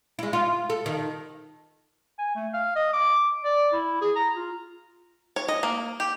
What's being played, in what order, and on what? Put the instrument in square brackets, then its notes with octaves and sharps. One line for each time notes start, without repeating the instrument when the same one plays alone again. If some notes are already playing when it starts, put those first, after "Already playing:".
[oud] G#3 E4
F4
A4
D#3
[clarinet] G#5
A3
F5
D#5
D6
D5
E4
G#4
A#5
F4
[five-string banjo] C#5
D#5
A#3
G4